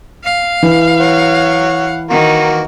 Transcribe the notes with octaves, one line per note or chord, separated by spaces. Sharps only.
F5
E3
C#5 F#5
D#3 A#3 F#4